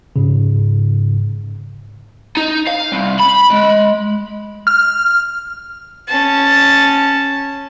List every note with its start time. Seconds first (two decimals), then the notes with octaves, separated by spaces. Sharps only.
0.16 G#2 C#3
2.37 D#4
2.68 F5
2.92 C2
3.20 B5
3.50 G#3
4.67 F6
6.08 C#4 A5